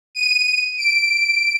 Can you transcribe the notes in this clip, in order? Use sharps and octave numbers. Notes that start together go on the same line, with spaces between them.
D#7
D7